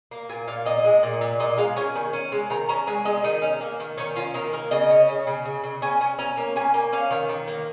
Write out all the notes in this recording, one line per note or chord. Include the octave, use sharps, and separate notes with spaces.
A#3
A#2 G#5
A#2 F5
A#2 D#5
G#3
A#2
A#2
A#2 D#5
G#3 F5
C#4 G#5
D#3
C#4
G#3
D#3 A#5
C#4 A#5
G#3 G#5
G#3 D#5
D#3 D#4
C#4
A#3
D#3
D#3 C#4
C#4 F4
D#3 A#4
A#3 A#4
C#3 D#5
C#4
C#3
C#3
C#3
C#3
C#4 G#5
C#4
C#4 A#5
A#3
C#4 G#5
A#3
C#4 F5
D#3
D#3
A#3